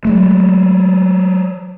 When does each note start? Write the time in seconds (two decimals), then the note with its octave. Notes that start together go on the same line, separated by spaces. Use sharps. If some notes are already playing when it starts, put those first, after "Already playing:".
0.05 F#3 G#3 A3